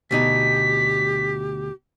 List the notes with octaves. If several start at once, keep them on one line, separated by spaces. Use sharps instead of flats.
D2 B2 D#4 G4 B6